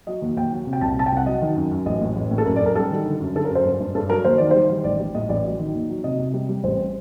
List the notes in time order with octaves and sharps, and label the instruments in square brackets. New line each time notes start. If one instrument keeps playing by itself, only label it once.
[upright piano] F#3 D#5
D#2
D#2 G5
F#3
C3
G5
C2 A5
C3 A5
G5
C2 F#5
F#3 D#5
D#3
F#2
F#2
A1 D#5
A2
A1
A2
A4
F#2 A#4
D5
F#2
A#4
G3 A4
D#3
D3
F#2
D3 A4
A#4
F#2 C5
G2
G2
G2 A4
F#3 A#4
D#2 C5
D#3 D5
G3 C5
D#3
A1 D5
G3
A2 D#5
A1 D5
F#3
D#3
D#2
F#3
C3 D#5
C3
G3
G3
A1 C5